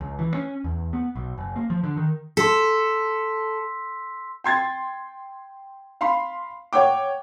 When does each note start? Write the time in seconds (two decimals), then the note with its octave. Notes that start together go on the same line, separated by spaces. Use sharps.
0.01 C#2
0.19 E3
0.34 C#4
0.64 E2
0.93 B3
1.16 B1
1.38 F#1
1.56 A#3
1.70 F3
1.84 D3
1.97 D#3
2.37 A4 C6 E6 B6
4.44 G5 C6 G#6 A6
6.01 F5 B5 C6
6.73 C#5 F#5 G5 D6